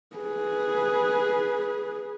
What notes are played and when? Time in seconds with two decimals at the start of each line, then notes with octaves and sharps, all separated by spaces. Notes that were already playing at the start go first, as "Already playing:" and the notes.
0.16 G#4 B4